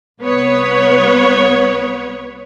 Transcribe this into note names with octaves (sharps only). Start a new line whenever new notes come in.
C2 B3 B4 C#5